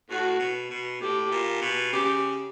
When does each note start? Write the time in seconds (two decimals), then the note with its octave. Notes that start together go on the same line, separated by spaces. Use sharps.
0.09 A2 F#4
0.39 B2
0.70 B2
1.01 A2 G4
1.31 A#2
1.61 B2
1.92 C#3 G4